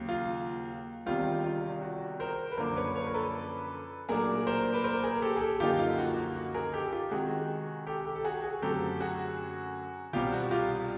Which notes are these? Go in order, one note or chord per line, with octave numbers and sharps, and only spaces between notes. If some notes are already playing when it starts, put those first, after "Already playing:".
Already playing: D#2 C#3 F#3
F4
E2 C3 D#3 G3 F4
F4
F#4
A#4 C5
B4
F#2 D3 F3 A#3 D4 A#4 C5
B4 C#5
B4 C#5
A#4
A4 B4
A#2 F#3 A3 D4 G#4 A#4
A#4 C5
B4
A#4 C5
G#4 A#4
G4 A4
G#4
G4 A4
F#2 D3 F3 A#3 D#4 F4 G4
F4
F#4
F#4
F#4
G#4 A#4
G4 A4
F4 G4
C3 D#3 G#3 F#4 G#4
G4 A4
G4 A4
A4
F#4 G#4
F#4 G#4
F#2 D3 F#3 A3 C4 G4 A4
F#4 G#4
C2 B2 G3 C4 F4 G4
F#4
F4 G4